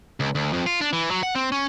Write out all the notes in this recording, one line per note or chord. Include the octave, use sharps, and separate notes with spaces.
C#2
D2
F2
F4
D4
E3
F#3
F#5
C4
C#4